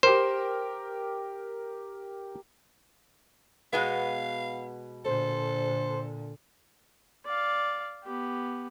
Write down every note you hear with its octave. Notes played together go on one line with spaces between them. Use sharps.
G4 A#4 C5
B2 G#3 B3 F5
A#2 D3 A4 C5
D5 F5
B3 G4